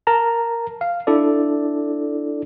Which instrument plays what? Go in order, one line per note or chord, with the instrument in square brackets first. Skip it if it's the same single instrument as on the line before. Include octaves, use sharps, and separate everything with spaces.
[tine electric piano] A#4 A5 A#5
F5
D4 E4 A4 D5